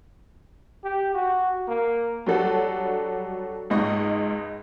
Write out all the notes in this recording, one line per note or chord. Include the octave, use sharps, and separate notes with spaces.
G4
F#4
A#3
F#3 G3 D4 F#4 A4 F#5
C#2 G#2 D#5 C#6